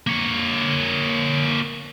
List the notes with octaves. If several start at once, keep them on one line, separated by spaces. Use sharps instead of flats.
A#3 C#5